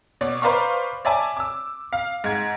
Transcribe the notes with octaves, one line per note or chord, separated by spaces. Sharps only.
B2 C#5 D5
B4 C5 D5 F5 A#5 C#6
C#5 D5 E5 G#5 A5
D6 E6
F5
G#2 G#6